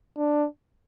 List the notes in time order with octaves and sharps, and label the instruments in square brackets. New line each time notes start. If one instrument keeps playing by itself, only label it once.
[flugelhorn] D4